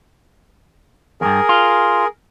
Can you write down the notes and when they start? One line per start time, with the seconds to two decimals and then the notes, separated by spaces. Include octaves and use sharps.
1.21 E2 G2 G#4 A#4
1.49 F4